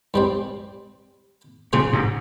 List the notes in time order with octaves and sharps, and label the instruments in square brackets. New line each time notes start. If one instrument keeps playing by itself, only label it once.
[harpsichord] G2 G3 C4
[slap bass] A#2 C#3 [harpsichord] F3 C4 F4 G#4
[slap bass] G#2 C3